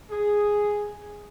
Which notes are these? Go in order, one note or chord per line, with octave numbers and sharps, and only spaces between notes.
G#4